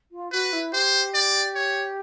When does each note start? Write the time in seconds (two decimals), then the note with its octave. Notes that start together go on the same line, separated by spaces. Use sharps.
0.12 F4
0.32 F#4 B4
0.53 E4
0.73 G4 C5
1.14 D5
1.55 C#5